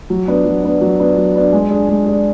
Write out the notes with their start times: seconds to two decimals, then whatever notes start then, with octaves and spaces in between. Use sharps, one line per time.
0.10 F#3
0.28 B3 D4
0.45 F#3
0.64 B3 D4
0.81 F#3
1.00 B3 D4
1.17 F#3
1.36 B3 D4
1.53 G#3
1.71 D4 G#4
1.89 G#3
2.06 D4 G#4